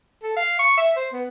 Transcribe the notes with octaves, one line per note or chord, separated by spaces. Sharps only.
A4
F5
C#6
E5
C5
B3